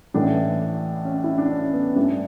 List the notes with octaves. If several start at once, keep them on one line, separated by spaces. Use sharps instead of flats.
A1 A2 E3 D4
C#4
E4
D4
C#4
B3
A1 G2 E3 D4